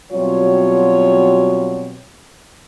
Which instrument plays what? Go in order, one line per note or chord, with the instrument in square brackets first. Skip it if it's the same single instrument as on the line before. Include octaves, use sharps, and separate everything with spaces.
[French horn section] B2 F#3 G3 C4 F4 C#5